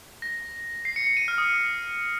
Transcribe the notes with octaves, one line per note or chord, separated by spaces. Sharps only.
A#6
C7
C#7
C#7
D#7
F6
D#6